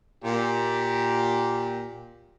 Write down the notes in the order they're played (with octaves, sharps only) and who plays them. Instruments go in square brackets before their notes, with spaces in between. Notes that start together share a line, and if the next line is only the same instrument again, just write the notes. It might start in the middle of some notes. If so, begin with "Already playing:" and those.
[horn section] A#2 G4